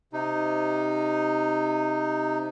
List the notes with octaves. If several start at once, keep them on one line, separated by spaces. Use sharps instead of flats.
C3 D#4